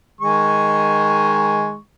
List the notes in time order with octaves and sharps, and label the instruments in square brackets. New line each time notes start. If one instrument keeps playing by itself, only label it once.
[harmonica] D#3 G#3 C#6